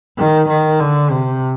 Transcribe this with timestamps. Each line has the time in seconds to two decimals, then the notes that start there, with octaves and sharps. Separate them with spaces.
0.18 D#3
0.49 D#3
0.80 D3
1.11 C3